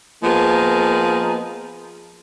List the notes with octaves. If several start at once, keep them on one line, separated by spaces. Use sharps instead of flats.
F3 A#3 B3 G#4 A#4 D#5